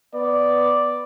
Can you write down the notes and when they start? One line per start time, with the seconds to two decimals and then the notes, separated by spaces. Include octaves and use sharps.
0.14 B3 D5